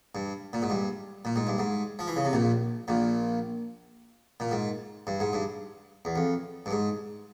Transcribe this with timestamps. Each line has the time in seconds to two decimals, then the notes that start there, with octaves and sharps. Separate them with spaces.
0.15 G2
0.53 A#2
0.62 G#2
0.70 G2
1.25 A#2
1.36 G#2
1.47 G2
1.59 G#2
1.99 F3
2.07 E3
2.16 C#3
2.25 C3
2.33 A#1 A#2
2.88 A#1 A#2
4.40 A#2
4.51 G#2
5.07 G2
5.20 G#2
5.33 G2
6.05 E2
6.16 F2
6.66 G2
6.71 G#2